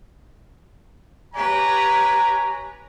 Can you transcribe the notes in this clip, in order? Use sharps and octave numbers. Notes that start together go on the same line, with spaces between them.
G4 B4 C#5 G#5 A#5